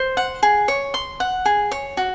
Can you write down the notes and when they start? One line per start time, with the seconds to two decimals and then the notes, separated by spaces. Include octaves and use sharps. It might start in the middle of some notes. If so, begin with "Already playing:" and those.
Already playing: C5
0.17 F#5
0.43 G#4
0.68 C#5
0.94 C6
1.20 F#5
1.45 G#4
1.71 C#5
1.97 F#4